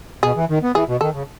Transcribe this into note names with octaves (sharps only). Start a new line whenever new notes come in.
B2 G#4
E3
D#3
B3
E3 G#4
B2
D#3 A4
C#3